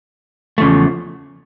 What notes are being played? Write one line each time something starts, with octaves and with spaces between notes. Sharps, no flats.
E2 C#3 F3 A3